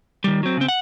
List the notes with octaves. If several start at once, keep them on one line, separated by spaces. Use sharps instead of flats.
D#3 G3
F#3 C4
C#3 C4
F#5